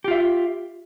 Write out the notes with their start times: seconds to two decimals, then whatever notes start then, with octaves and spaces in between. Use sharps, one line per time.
0.04 G4
0.08 F4
0.11 E5